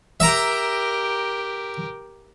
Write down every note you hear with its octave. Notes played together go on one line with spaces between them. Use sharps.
G4 A#4 E5 A#5